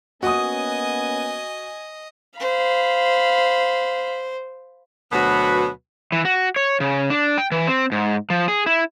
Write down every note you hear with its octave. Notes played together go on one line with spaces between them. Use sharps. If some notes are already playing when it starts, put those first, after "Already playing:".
A#3 B3 C#4 F#4 D#5 G#5 D#6
C5 F5 B5
D2 B2 F#3 B3 F#4 B4
E3
F#4
C#5
C#3
D4
G5
E3
C4
G#2
F3
G#4
E4